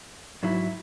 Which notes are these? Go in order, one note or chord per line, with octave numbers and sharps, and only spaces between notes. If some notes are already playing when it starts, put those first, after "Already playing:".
G#2 F#3 E4